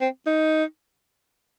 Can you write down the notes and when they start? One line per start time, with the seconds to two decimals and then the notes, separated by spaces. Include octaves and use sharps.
0.01 C4
0.26 D#4